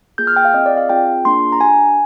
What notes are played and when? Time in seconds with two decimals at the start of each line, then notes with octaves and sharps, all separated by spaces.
0.18 A#3 F4 G#4 G6
0.27 F6
0.36 G5
0.45 F5
0.54 C4 F4 G#4 D#5
0.66 D5
0.77 F5
0.89 C4 F4 G#4 G5
1.25 A#3 D4 F4 G#4 C6
1.52 A#5
1.61 D4 G4 G#5